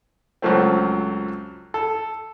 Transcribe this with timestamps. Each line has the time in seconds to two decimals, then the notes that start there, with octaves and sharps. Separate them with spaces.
0.42 C#2 F3 F#3 A3 C4
1.74 A4